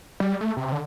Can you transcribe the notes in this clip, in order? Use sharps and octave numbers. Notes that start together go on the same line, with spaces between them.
G3
A3
C3
D3